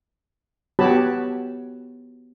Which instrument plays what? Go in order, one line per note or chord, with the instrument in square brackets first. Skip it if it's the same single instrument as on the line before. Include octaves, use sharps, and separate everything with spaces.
[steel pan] B3 F#4 G4 C#5 A5 B5